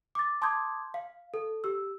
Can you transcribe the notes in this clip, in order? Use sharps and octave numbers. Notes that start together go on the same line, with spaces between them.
D6 A6
A5 C6 D6 D#6 G6 G#6
F5
A4
G4 E6